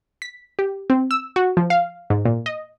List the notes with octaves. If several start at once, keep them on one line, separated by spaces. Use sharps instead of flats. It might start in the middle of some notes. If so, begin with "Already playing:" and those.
B6
G4
C4
E6
F#4
F3
F5
G#2
A#2
D#5